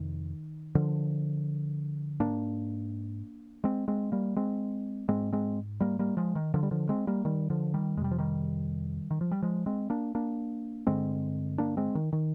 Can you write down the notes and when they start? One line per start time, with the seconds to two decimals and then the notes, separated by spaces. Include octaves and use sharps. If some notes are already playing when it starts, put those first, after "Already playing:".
Already playing: F2 C3 D#3
0.75 D3 F3
2.20 G#2 A#3 D4
3.64 G#3 C4
3.88 G#3 C4
4.12 G3 A#3
4.36 G#3 C4
5.08 G#2 G#3 C4
5.33 G#3 C4
5.80 G3 A#3
5.99 G3 A#3
6.17 F3 G#3
6.35 D#3
6.54 D3 F3
6.63 G3
6.71 D3 F3
6.89 G#3 C4
7.07 G3 A#3
7.25 D#3 G3
7.50 D3 F3
7.74 D#3 G3
7.97 F2 G#3
8.01 C3 G3
8.11 F3
8.18 D#3 G3
9.11 D#3
9.21 F3
9.31 G3
9.42 F3 G#3
9.66 G#3 C4
9.90 A#3 D4
10.15 A#3 D4
10.87 G2 D3 G#3 C4
11.58 A#3 D4
11.77 G#3 C4
11.95 D#3
12.13 D#3